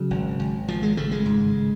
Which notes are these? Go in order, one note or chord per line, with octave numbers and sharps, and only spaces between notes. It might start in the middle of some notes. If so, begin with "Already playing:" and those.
Already playing: C#3 F#3
G#1
G#1
G#1 F3
G#3
C#3 A3
G#3
G#2